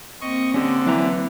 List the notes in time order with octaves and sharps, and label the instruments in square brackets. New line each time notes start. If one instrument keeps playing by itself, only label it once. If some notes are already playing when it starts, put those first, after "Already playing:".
[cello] A#3 C4 [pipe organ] D#5 C#6
[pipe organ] D3 [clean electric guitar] C#4 G4
[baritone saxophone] E3 [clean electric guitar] F#3 B4 A#5